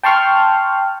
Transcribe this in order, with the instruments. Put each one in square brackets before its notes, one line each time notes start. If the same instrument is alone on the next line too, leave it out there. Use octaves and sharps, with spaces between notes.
[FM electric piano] G5 A5 C6 C#6 F6